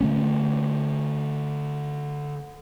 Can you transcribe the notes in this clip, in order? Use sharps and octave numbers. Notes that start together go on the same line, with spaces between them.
D3 A3 C#4